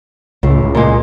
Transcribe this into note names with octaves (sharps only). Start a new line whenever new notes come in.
C#2 A2
C#2
A#2 G#3